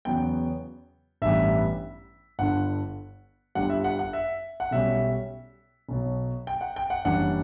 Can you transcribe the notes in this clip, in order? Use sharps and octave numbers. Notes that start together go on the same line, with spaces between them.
E2 C#3 F#3 B3 G5
A1 G2 E3 G3 B3 E5
G1 G2 D3 F#5
G1 G2 D3 G3 F#5
E5
F#5
F#5
E5
F#5
B1 B2 G3 C#4 E5
B1 B2 F#3
G5
F#5
G5
F#5
F#1 F#2 E3 G3 D4 F#5